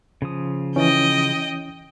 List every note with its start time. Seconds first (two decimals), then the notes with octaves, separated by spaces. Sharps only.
0.22 C#3 F3 D#6
0.76 E3 C#4 D#5 G5